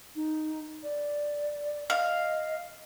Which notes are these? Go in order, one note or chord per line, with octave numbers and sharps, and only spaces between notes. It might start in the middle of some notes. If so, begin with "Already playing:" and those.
D#4
D5
D#5 F5